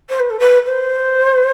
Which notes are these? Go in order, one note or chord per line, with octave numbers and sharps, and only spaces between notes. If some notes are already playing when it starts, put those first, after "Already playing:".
C5
B4
A4
B4
C5